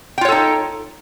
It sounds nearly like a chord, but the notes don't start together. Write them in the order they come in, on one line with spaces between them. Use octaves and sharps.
G5 F4 C#5 A4 D#4